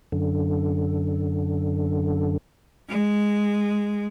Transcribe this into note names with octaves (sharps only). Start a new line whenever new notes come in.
F#2 D3
G#3